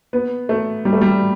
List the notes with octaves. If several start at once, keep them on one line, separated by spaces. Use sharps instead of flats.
B3
A3
G3
A3
G3